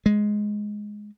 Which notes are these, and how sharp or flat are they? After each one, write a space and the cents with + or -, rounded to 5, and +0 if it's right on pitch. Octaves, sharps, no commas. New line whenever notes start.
G#3 +5